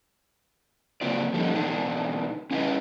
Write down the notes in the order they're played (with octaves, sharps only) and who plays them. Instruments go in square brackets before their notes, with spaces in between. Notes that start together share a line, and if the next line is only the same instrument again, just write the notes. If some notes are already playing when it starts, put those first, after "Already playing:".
[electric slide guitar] C#3 F#3 A#3 C4 F4 D5
F3 G3 A3 A#3 C#4 D#4
B2 E3 B3 D4 D#4
C#4 E4 F4 B4 D#5